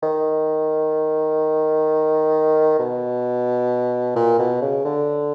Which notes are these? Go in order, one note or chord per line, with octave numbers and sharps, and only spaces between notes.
D#3
B2
A#2
B2
C#3
D3